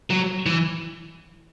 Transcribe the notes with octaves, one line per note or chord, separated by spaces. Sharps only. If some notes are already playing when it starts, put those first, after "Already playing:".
F#3
E3